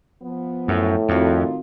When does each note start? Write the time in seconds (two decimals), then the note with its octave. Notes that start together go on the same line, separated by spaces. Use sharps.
0.22 F3 B3
0.68 F#2 A2
1.09 F2 D#3 C4 D#4 F4 F#4